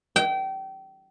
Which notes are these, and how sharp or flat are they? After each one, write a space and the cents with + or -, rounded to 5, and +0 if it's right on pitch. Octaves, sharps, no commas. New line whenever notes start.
G5 -30